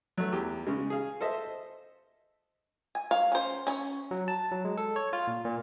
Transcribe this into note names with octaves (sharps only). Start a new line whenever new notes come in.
F#3 A3
E2 G4
C#3 G#3
G#4 F5
A4 C5 D#5 E5
G#5
C#5 F5
C#4 C5
C#4 C#5
F#3
A5
F#3
G#3
A4
C#5
F4
A#2
A#2